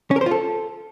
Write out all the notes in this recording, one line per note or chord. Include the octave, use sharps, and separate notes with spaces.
C#4
A#4
C5
F4
A4